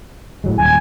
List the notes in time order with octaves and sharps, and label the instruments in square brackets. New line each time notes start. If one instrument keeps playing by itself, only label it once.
[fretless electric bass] A2 F#3 G#3
[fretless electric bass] D#1 [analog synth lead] G#5